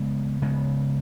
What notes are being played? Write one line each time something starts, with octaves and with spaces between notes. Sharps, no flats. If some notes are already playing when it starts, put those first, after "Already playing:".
Already playing: C#3 G#3 B3
C#3 G#3 B3